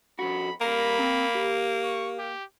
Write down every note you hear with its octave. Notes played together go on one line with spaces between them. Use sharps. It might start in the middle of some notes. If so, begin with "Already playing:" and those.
F2 F#4 B5
G3 A#3 A#4 A#5 B5
C4
G4
C#6
G4